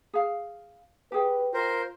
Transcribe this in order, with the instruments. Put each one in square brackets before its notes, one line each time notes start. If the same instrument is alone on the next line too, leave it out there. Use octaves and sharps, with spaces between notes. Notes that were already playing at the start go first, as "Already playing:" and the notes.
[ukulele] G#4 F5
[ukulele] G4 G#4 G5 [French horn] B4
[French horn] F4 [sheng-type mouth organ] A#4 C5